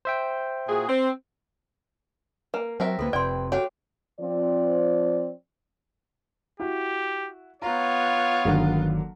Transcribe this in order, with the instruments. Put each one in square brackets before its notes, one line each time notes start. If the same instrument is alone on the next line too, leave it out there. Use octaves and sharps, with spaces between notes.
[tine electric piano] C5 E5 G5
[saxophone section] A#2 F#4 G#4
C4
[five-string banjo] A#3 [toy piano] B4
[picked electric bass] F#3 [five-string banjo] C4 A#4 E5
[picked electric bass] D2 A#3 [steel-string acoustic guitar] F3 B4 [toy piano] A4
[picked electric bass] F1 C3 [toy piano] D5 C6 [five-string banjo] G5
[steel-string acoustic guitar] F#4 A4 F5 [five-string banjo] G4 [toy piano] C#5 F#5
[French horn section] F3 C4 D5
[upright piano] E4 F#4 [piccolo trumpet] G4
[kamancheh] B3 F4 [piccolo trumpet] C#5 [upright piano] A#5
[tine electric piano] G1 D#3 [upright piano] D3 F#3 A#3